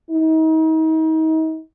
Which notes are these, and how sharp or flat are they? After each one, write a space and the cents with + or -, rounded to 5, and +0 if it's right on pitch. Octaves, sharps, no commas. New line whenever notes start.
D#4 +35